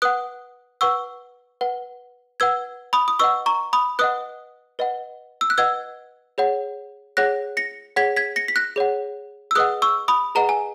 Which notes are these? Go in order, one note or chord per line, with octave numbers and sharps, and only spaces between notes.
B4 F#5 D#6 F#6
B4 F#5 C#6 E6
B4 F#5
B4 F#5 E6 G#6
B5 D#6
D#6
B4 D#5 F#5 C#6 E6
A#5 C#6
B5 D#6
B4 D#5 F#5 D#6 F#6
B4 D#5 F#5
E6
F#6
B4 D#5 F#5 E6 G#6
G#4 C#5 F#5
G#4 C#5 F#5 F#6 A#6
A#6 C#7
G#4 C#5 F#5 G#6 B6
G#6 B6
A#6 C#7
B6
F#6 A#6
G#4 C#5 F#5
E6
G#4 B4 D#5 F#5 D#6 F#6
C#6 E6
B5 D#6
G#4 B4 D#5 F#5 A#5
G#5